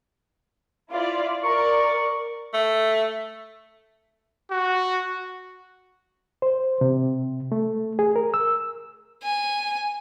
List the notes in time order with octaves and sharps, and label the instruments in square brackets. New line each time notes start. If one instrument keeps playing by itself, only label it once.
[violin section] E4 F4 D5
[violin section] A#4 D5 [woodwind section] C#6
[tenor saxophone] A3
[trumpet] F#4
[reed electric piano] C5
C3
A3
G#4
A#4
E6
[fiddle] G#5